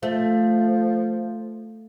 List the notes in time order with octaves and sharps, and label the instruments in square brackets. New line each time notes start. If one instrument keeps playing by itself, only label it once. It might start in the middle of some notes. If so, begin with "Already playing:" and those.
[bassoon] F3 [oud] A3